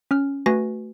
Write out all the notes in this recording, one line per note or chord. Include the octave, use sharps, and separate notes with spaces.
C#4 F6
A3 F#4 B4 G#5 A#6